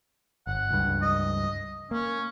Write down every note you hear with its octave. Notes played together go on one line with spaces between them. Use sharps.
G1 F#5
C#2 G2
D#5
A#3 C#4